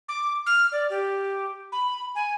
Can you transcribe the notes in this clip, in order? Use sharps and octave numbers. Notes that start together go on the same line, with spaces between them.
D6
F6
D5
G4
B5
G#5